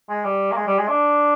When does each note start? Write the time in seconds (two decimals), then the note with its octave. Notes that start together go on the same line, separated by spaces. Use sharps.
0.09 G#3
0.24 G3
0.52 A#3
0.57 G#3
0.67 G3
0.78 G#3
0.88 D4